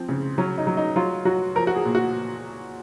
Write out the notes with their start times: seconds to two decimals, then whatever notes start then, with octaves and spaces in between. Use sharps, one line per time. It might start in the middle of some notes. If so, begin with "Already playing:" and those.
Already playing: F3 C4
0.09 C#3
0.38 F#3 C#4
0.58 D#4
0.67 F#3
0.77 D#4
0.96 F#3 F4
1.25 F#3 F#4
1.55 F3 A#4
1.67 F#4
1.75 G#4
1.85 A#2
1.95 F#4